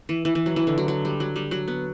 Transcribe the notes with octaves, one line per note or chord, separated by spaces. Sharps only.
E3
E3
E3
F#3
E3
D3
F#3
F#3
G3
F#3
G3
F#3
B3